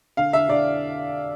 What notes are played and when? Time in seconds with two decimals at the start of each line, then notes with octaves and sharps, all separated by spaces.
0.17 D3 F5
0.33 D3 E5
0.49 D3 D5